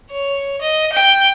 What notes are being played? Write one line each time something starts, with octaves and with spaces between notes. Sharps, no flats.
C#5
D#5
G5